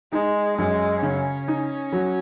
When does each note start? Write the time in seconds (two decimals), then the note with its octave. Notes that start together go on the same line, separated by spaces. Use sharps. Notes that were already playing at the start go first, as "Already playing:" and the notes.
0.13 G#3 D#4
0.57 F#2 G#3
1.03 C#3 C#4
1.48 D#4
1.92 F#3